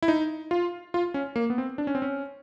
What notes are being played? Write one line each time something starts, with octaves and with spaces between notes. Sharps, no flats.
E4
D#4
F4
F4
C#4
A#3
B3
C4
D4
C#4
C4
C#4